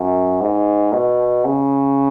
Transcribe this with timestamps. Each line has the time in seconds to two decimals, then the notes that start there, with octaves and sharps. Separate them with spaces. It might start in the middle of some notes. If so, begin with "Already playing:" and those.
Already playing: F#2
0.41 G#2
0.93 B2
1.45 C#3